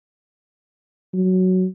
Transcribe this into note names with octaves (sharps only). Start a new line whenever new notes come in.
F#3